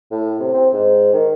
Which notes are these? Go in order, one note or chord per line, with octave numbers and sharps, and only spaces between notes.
A2
C3
C4
G#2
D#3